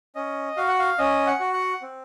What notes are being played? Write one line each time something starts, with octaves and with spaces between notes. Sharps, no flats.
C#4 D#5
F#4 F5
F#5
F5
C#4 D#5
F#5
F#4
F#5
C4